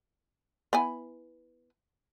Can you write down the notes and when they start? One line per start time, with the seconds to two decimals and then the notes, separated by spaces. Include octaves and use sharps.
0.73 B3 E4 G#5